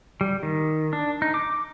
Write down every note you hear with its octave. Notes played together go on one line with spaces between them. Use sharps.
G3
D#3
D4
D#4
D6